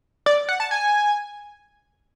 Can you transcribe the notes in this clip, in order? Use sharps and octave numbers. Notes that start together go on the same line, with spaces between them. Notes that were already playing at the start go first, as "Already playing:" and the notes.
D5
F#5
A5
G#5